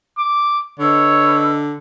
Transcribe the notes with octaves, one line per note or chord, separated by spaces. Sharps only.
D6
D3 B4 C#5 D#5 E6